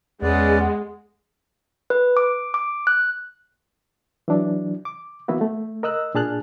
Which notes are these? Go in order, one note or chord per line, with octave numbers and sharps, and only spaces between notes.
E2 G#3 C#4 B4 D5 F#5
B4
D6
D6
F#6
E3 F#3 D4
D6
E3 A#3 B3 E4 F#4
A3
A#4 D#5 E6 F#6
A#2 D4 G#4 A5 F6 F#6